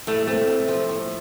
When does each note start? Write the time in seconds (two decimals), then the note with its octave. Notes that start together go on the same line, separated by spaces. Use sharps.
0.07 A2 A3
0.27 A3 C4
0.48 A2
0.68 F3
0.89 A2